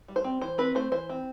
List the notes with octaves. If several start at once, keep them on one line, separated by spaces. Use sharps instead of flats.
G3
C5
C4
E3 C5
C4 B4
A3 C5
E3 C5
C4